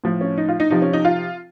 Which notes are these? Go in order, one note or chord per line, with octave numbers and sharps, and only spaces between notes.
A2 F3
C#4
D#4
F4
D#4
C3 F3 D#4
C#4
D#4
F4